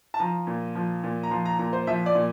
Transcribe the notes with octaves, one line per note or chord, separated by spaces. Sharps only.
A5
F3 A#5
A#2
F3
A#2
A#5
F3 C6
A#5
A#2 A#5
C5
F3 E5
D5
A#2